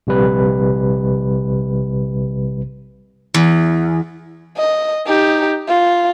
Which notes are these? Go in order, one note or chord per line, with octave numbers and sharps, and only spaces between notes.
A#1 C3 G3 B4
E2
D#5
D#4 G4
F4